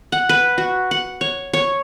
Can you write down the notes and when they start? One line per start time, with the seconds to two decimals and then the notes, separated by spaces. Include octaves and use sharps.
0.12 F#5
0.29 B4
0.58 F#4
0.91 F#5
1.21 C#5
1.54 C#5